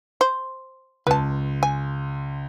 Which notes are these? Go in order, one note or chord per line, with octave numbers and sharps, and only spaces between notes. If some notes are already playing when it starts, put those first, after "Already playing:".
C5
C#2 B4 A5
G#5